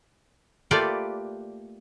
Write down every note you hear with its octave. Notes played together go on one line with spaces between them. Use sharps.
A3 A#3 F4 G4 B4 D5